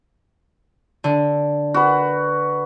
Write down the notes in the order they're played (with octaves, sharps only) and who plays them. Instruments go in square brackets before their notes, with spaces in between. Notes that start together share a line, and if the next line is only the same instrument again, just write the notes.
[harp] D3
[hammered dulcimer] F#4 B4